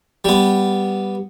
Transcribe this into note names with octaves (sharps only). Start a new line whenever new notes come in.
G3 B3